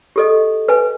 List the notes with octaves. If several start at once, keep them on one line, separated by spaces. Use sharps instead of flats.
G4 A4 D#5
B4 G#5